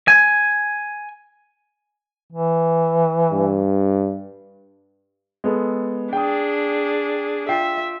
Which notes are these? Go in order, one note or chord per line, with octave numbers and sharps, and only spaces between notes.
G#5
E3
G2
G#3 B3 A4
D4 G#4 G5 D#6
F4 E5 G5 C7